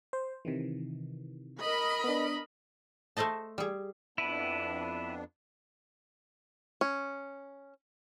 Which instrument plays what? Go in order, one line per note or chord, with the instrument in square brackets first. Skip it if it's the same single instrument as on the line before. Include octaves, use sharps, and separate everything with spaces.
[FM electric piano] C5
C3 D#3 E3
[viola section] A#4 D#5 B5
[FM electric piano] B3 D4
[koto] A3 A4 C5 D#5 A5
G3 G#4
[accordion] F2 B3 D4 [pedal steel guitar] E4 B4
[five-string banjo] C#4